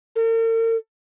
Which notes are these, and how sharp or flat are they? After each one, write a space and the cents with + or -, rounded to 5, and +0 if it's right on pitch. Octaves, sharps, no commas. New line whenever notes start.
A#4 -45